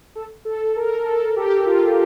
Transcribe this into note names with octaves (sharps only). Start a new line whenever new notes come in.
A4
A4
A#4
A4
G4
F4